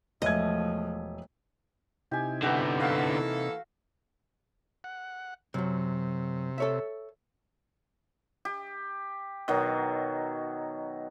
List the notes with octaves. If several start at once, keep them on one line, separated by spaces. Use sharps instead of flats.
E1 F3 A3 D#5 E5 G#6
C3 D#4 E4 G4 G#5
D3 A3 B3 F#4 G4
E3 A#3 F#4 A4 F5
F#5
F#2 C3 F#3
A4 C#5 E5
G4
B2 D#3 F#3